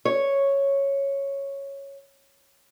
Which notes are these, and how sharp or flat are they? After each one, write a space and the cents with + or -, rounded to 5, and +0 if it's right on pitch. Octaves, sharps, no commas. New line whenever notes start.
C#5 -5